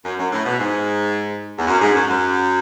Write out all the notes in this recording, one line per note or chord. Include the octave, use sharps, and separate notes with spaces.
F#2
F#2
A2
B2
G#2
E2
F#2
G#2
F#2
F#2